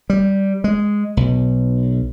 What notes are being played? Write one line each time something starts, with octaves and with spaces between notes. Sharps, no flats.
G3
G#3
B1